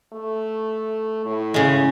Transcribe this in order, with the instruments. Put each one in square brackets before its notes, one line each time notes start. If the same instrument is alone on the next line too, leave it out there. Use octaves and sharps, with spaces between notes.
[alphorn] A3
A2
[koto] C#3 G#3